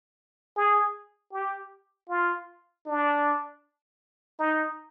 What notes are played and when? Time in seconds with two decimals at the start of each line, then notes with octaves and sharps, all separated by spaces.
0.57 G#4
1.33 G4
2.10 F4
2.86 D4
4.39 D#4